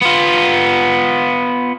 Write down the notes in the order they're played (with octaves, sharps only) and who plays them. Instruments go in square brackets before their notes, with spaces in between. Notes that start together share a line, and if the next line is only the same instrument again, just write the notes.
[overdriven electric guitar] B3 F4